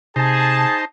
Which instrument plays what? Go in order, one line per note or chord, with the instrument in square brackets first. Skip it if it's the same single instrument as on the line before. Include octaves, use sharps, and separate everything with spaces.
[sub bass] C3 [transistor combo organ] D#4 C5 [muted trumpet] G#4 [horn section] A5